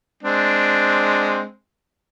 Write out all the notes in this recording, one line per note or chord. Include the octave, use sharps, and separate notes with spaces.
G#3 C4 D4